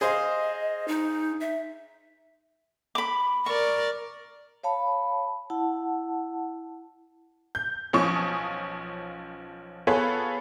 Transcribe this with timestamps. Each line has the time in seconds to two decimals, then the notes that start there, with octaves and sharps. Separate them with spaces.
0.01 G#4 C5 D#5 F5
0.88 D#4
1.41 E5
2.95 B5 D6
3.46 A#4 D5 C#6
4.63 C#5 F5 A5 B5
5.50 E4 F#5 A5
7.55 G6
7.93 B1 F3 C#4 C#6 D#6
9.87 B3 F4 G#4 A4 B4 C#5